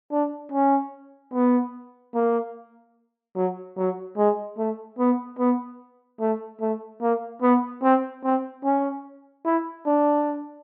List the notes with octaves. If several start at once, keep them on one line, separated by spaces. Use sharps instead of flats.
D4
C#4
B3
A#3
F#3
F#3
G#3
A3
B3
B3
A3
A3
A#3
B3
C4
C4
C#4
E4
D4